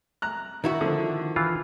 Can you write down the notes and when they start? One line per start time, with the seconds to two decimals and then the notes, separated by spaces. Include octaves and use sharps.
0.22 A#5 F#6
0.64 D#3 E4 F#4
0.81 D3 F3
1.36 E3 F4